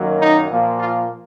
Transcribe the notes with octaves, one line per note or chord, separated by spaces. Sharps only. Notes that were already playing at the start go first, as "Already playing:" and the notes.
Already playing: F#2 D#3 F#3 A#3
D#4
A#2 F3 A#3
F4